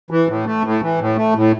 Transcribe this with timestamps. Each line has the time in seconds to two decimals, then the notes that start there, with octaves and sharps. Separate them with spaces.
0.11 E3
0.28 A2
0.46 A3
0.64 A2
0.82 E3
0.99 A2
1.17 A3
1.35 A2